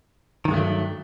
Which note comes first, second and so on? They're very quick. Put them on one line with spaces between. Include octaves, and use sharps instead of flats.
D#3 G2 G#3 A3 F#3